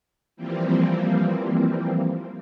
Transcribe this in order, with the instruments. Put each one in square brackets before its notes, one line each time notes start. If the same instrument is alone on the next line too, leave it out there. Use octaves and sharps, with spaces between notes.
[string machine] E3 F3 G3 A#3 C4